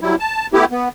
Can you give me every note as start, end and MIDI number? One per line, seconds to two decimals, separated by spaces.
0.01 0.15 54
0.01 0.15 55
0.01 0.15 64
0.19 0.47 81
0.53 0.65 57
0.53 0.65 59
0.53 0.65 64
0.53 0.65 67
0.71 0.89 59